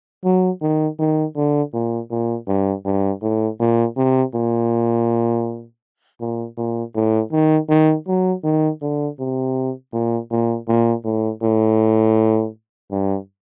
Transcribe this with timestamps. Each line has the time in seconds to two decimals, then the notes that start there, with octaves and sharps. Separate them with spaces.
0.25 F#3
0.62 D#3
0.99 D#3
1.37 D3
1.74 A#2
2.10 A#2
2.48 G2
2.86 G2
3.23 A2
3.60 A#2
3.97 C3
4.35 A#2
6.21 A#2
6.57 A#2
6.96 A2
7.32 D#3
7.69 D#3
8.08 F#3
8.44 D#3
8.82 D3
9.20 C3
9.93 A#2
10.31 A#2
10.68 A#2
11.05 A2
11.43 A2
12.91 G2